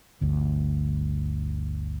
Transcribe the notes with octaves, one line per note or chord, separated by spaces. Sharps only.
G1 D2